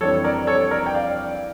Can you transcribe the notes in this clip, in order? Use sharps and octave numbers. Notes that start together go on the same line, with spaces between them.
F2 E3 G3 D4 A4 C#5
A#4 D5
A4 C#5
A#4 D5
G5
D5 F5